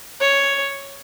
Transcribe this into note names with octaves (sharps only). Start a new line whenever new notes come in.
C#5